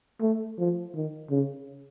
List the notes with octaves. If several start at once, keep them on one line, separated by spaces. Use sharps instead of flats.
A3
F3
D#3
C#3